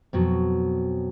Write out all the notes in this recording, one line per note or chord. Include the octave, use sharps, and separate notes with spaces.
F2 B2 F#3